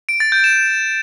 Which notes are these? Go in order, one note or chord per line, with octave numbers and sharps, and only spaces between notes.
D7
A6
G6
E7